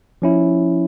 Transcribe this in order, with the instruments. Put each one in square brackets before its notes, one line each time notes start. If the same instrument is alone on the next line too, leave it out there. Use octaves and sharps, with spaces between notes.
[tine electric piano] F3 C#4 E4